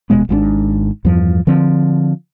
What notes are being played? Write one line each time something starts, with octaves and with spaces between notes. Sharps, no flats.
D#1 B2 G#3 B3
G#1 G#2 E3 D4
E2 G2 F3
D3 F3 C4